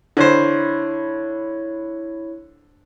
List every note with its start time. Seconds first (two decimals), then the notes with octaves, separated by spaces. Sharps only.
0.17 D3 E4 C5 C#5